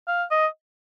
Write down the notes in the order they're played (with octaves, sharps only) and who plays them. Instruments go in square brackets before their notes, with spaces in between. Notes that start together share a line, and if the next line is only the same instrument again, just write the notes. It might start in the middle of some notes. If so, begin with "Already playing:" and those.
[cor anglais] F5
D#5